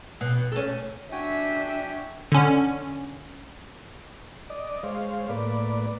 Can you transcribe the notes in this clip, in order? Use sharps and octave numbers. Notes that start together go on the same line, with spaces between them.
B2
A3 C#4
D4 F#4 E5 G5 G#5
D3 C#4
D5 D#5
G#3 C5 C#5 F5
A2 A#3 B4 D5